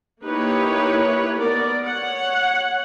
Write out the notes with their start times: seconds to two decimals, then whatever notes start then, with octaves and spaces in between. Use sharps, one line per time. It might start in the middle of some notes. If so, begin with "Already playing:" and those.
0.24 A#3 D#4 E4 G4 B4 C#5
1.37 B3 A#4 D5
1.85 C#5 F#5